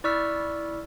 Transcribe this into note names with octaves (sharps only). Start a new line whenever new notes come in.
E4 D5 C#6 E6 F6 B6